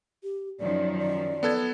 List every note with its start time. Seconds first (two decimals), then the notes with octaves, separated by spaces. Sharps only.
0.23 G4
0.60 F#2 D#3 F3 D5
0.99 D5
1.43 B3 A4 G#6